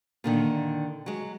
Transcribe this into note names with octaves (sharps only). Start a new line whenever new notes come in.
A#2 D3 D#3
F#3 G#3